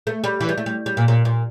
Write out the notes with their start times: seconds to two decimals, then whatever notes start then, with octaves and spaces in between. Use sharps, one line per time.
0.07 A3
0.24 G3
0.41 E3
0.49 G3
0.58 A3
0.66 G3
0.86 G3
0.97 A#2
1.08 A#2
1.25 A#2